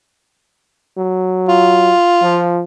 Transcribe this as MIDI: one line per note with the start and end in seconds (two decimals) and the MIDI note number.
0.98 1.93 54
1.49 2.51 65
2.22 2.62 53